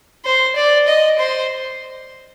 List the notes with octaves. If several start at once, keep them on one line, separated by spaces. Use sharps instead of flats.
C5
D5
D#5
C5